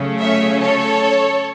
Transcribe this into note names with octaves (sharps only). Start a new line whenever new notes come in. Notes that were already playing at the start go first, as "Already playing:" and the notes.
Already playing: C#3 F#3 A3 C#4
C#5 E5
A4 C#5